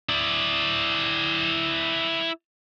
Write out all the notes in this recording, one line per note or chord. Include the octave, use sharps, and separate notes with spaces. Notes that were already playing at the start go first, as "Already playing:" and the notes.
E4 D5